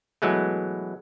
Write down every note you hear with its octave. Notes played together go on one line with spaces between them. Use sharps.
B2 E3 F#3 G#3 A3